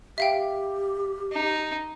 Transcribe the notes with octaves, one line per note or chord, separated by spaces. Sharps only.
G4 E5 F5 G5
D#4